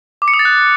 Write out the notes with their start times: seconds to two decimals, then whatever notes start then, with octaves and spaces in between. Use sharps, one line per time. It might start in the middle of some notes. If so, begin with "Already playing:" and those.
0.22 D6
0.28 C#7
0.34 D#6
0.39 A6
0.45 F#6